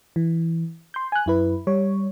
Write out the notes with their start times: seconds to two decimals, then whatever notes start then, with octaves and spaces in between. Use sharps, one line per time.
0.16 E3
0.94 C6 G6
1.12 G#5 F#6
1.26 F#2 E4 B4
1.67 G3 C#5